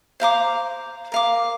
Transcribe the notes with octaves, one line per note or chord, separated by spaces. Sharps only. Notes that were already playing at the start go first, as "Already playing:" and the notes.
C5 F5 A#5 D6
A#4 F5 D6